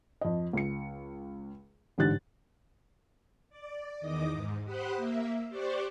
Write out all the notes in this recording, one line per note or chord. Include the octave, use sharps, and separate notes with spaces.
F2 D#5
C#2 C#7
A1 G#2 D3 G4 F#6 A6
D5
E2 D#3 D#5 D6 D#6
G#2
G4 C5 F#5 B5 D#6 F#6
A#3 E5
G4 C5 D5 C#6 D6 F#6